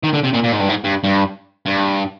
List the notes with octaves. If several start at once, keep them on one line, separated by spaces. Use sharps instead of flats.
D#3
D3
C3
A#2
A#2
G#2
G2
G#2
G2
G2
G2